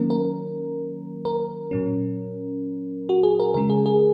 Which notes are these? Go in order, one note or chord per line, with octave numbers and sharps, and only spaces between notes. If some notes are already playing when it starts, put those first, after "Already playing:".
Already playing: D#3 F#3 A#3 C#4 A#4
A#4
A#4
A#2 F#3 C#4
F#4
G#4
A#4
C#3 G#3 C#4 A#4
G#4
G#4